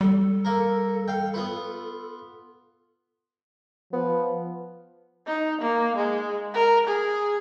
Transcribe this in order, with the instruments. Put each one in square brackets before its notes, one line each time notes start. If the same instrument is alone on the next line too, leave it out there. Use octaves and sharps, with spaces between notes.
[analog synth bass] G3 [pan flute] A4
[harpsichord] A#3 A#4
F5 G5
B3 F4 B4
[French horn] F3 [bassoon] B3
[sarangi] D#4
A#3
G#3
A#4
G#4